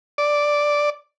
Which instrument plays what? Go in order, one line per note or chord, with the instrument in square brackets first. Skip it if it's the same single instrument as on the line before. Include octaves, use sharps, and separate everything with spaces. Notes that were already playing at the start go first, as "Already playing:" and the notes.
[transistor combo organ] D5